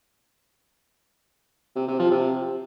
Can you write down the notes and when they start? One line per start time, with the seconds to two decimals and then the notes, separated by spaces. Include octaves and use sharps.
1.76 C3
1.88 C3
2.00 F3
2.11 C3